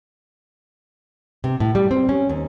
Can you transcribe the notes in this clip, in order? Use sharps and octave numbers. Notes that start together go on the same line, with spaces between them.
C3
A2
G3
C4
C#4
D#2